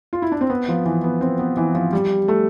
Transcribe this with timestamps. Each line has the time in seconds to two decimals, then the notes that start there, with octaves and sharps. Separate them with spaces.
0.13 F4
0.22 E4
0.32 D4
0.41 C4
0.50 B3
0.68 F3
0.86 E3
1.04 B3
1.21 C4
1.39 B3
1.57 E3
1.75 F3
1.93 G3
2.28 A3